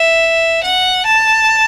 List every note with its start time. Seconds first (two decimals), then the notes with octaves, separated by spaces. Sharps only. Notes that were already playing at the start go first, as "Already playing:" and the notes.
Already playing: E5
0.63 F#5
1.06 A5